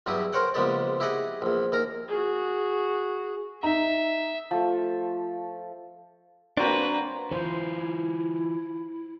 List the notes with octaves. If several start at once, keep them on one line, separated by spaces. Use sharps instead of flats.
E2 G2 F#3 E4 G4 D#6
A#4 C5 C#5 F#5 G5
A#1 C#3 G#3 B3 G4 D5
E4 G4 G#4 D#5 F#5 G#5
A#1 E2
D#2 A#4 A#5
F#4 G#4
D#4 E5 A#5
F3 A3
F#3 A#3 C4 D4 B4
E3 E4 F4 C5